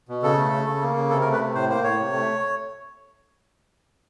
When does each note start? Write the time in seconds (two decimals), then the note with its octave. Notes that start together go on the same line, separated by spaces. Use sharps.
0.09 B2
0.23 C#3 A4
0.38 A3
0.53 C#3
0.67 C#3
0.81 A#3
0.96 C#3
1.10 C3 A4
1.21 A#4
1.25 A3
1.33 B4
1.40 C3
1.55 A2 C5
1.69 A#3 C5
1.84 A2 C#5
1.99 C3
2.12 A3